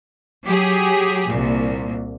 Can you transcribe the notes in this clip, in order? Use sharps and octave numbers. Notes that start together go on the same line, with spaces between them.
F#3 G4 G#4
C2 A#2